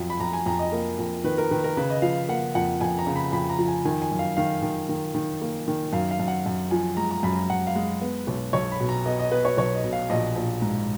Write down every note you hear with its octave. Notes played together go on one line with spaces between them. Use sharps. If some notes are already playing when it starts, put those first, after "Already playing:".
Already playing: F2 F#3
B5
F2 A#5
G#5
F2 A#5
D#5
A#3
F2
D#3 B4
A#4
D#3 B4
A#4
C#3 B4
D#5
F3 F5
A#3 F#5
F2 F#5
F2 G#5
A#5
C#3
B5
F2 B5
A#5
F3
G#5
D#3 G#5
G#5
F#2
F5
D#3 F5
D#3
D#3
D#3
A#3
D#3
F#2 F5
F5
F#2
F#5
F#2
F3 G#5
G#3 A#5
A#5
F#2 B5
A#5
F#2 F#5
F5
G#3
B3
B1
B1 C#5
B5
B2
A#5
B3 D#5
D#5
B3 B4
C#5
B1 C#5
D#5
B2
F5
A#1 D#5
A#1
G#2